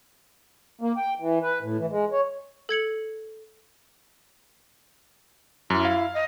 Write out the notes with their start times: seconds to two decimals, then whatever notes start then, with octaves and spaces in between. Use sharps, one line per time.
0.81 A#3
0.97 G5
1.19 E3
1.43 B4
1.61 A2
1.78 E3
1.90 G#3
2.12 C#5
2.69 A4 G#6 C#7 F#7
5.70 F#2 E4
5.85 F5
6.14 D#5